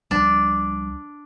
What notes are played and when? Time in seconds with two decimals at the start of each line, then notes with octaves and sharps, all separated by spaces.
0.11 C#2 F3 G3 D4